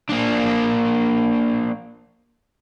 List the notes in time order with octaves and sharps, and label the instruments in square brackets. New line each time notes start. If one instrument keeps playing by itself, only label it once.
[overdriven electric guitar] A#3 D4